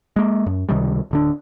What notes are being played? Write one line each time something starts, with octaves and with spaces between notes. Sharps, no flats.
G#3 A#3
F#2
C#2 C3 D#3 G3
D1 D3 D4